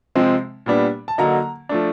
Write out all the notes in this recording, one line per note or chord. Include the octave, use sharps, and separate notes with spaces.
C3 F3 G#3 C4
A#2 G3 B3 D4
A5
D3 F#3 A#3 D#4 A#5
F3 A3 D4